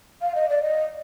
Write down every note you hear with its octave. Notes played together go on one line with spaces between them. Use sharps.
F5
D#5
D5
D#5